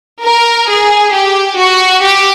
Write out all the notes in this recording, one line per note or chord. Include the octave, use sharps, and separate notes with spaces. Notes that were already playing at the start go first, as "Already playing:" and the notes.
A#4
G#4
G4
F#4
G4